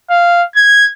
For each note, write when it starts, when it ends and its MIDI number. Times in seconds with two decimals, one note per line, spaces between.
0.10 0.43 77
0.55 0.88 92